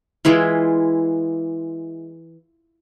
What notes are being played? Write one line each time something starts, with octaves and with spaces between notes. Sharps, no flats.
E3 G#3 E4 F4